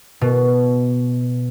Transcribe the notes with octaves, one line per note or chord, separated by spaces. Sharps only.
B2